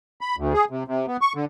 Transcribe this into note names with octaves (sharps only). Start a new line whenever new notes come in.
B5
D2
G#4
C3
C3
B3
C#6
D3